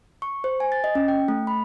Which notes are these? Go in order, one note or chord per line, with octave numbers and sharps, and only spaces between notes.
C#6
C5
G#5
A6
D#5
C#4
G5
A3
B5